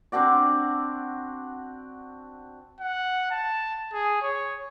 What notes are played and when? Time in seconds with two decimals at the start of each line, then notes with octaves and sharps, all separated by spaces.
0.12 C4 D4 F#4 D5
2.80 F#5
3.31 A5
3.93 G#4
4.22 C#5